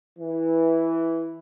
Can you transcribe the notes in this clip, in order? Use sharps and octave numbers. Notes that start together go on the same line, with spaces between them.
E3